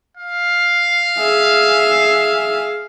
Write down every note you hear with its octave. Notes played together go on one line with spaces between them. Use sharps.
F5
G#4 E5